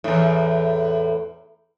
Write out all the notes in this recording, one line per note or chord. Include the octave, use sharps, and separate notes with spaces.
E2 A2